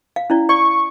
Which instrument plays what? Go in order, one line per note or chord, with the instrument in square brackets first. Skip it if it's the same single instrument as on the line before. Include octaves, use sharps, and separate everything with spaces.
[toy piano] F5
C#4 E4 D5
[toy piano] D5 [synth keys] C#6